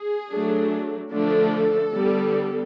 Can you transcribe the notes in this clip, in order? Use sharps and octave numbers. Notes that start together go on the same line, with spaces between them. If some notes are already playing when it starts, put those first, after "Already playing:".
Already playing: G#4
F#3 A3 D4
D3 F3 A3 D4 A4
D3 G3 B3